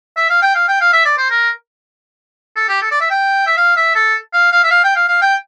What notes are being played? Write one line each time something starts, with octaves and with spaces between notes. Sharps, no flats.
E5
F5
G5
F5
G5
F5
E5
D5
C5
A#4
A4
G4
A4
D5
E5
G5
E5
F5
E5
A4
F5
F5
E5
F5
G5
F5
F5
G5